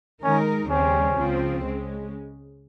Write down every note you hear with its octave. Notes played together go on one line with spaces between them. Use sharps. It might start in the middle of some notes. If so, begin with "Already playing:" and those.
D#3 G#3 C#4 D#4 A#4
D#2 C#3 G3 C4 C#4
C#2 C#3 F3 C4
C#3 G#3